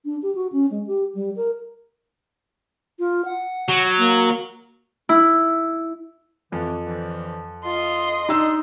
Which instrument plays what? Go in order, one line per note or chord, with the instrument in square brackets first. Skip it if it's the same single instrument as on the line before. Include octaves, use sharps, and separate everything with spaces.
[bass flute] D4
G4
F#4
C#4
G#3
G4
G3
A#4
F4
F#5
[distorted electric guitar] F#3
[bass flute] A#3
[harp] E4
[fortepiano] F2 [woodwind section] E3
[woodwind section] D3 E3 F3
[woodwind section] F4 [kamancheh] D#5 C6
[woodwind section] D4 [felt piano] D#4 E6